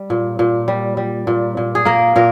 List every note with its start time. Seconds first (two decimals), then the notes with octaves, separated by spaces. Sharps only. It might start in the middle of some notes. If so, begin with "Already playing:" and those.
Already playing: G3
0.10 A#2
0.39 A#2
0.68 G3
0.97 G3
1.27 A#2
1.57 A#2
1.75 G#4
1.85 A#3 A#4
2.16 A#2 A#4